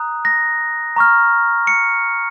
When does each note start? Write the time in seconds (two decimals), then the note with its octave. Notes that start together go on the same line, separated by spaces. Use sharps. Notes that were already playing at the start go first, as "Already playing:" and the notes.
Already playing: A#5 D#6 F#6
0.25 A#6
0.96 A#5 C#6 F6
1.67 C#7